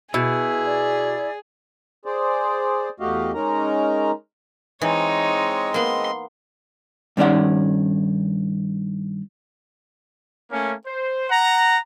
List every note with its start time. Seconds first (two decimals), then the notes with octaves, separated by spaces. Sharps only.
0.14 B2 E4 G#4
0.65 D5
2.05 G#4 C5 D5
3.00 E2 A3 F#4 G4 D#5 F5
3.34 G#3 C#4 D#4 A#4 A#5
4.81 E3 G#3 C4 D#4 C#5 D#5
5.74 A#3 B3 C6
7.17 G2 D#3 C#4 D5 F#5
10.51 A3 A#3 C#4
10.87 C5
11.30 F#5 A#5